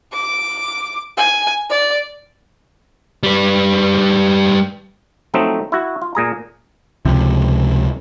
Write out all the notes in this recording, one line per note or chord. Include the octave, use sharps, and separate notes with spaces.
D6
G#5
D5
G3 B4
F3 F#3 A3 C4 D#4
E4 F#4
F4
A#2 G#4 A#5
C#2 C3 F3